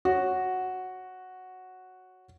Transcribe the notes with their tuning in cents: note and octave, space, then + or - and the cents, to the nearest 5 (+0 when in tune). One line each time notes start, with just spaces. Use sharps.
F#4 +0 C#5 -10